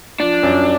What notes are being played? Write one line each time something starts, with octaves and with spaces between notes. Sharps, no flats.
F3 D4
F#2